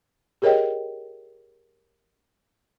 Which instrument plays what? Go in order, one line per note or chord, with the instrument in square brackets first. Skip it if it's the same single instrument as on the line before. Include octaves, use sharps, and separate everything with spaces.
[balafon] G4 G#4 A#4 C#5 D#5 G5